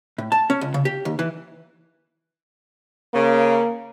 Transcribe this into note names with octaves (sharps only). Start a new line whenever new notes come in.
A2
A5
C#4
C#2
C#3
G4
D#2
E3
C#3 A#3